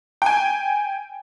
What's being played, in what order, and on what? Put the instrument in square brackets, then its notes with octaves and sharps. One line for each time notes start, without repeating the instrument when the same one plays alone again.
[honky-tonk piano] G5 G#5